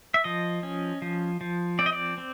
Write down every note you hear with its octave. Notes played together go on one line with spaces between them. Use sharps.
E5
F3 D#5
C#4
F3
F3
C4 D5
D#5
D5
C4